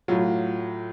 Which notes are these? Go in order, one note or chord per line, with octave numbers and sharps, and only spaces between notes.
A2 F#3 F4